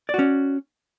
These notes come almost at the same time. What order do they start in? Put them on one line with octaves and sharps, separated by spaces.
D5 F#4 C#4